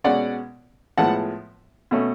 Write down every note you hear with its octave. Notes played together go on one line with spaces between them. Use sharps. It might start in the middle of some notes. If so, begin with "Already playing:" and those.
B2 G#3 C#4 D5 F#5
A2 F3 G#3 B3 F#5 A5
B2 A3 C#4